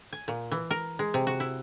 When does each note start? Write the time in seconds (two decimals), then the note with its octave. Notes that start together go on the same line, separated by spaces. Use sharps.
0.12 G#5
0.28 A#2
0.51 E3
0.70 A#4
0.99 G#3
1.14 C3
1.27 F#4
1.40 E4